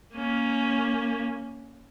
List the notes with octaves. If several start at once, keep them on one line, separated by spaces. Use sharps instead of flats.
A#3 C#4